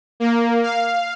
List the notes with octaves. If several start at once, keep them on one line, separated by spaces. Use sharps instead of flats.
A#3
F5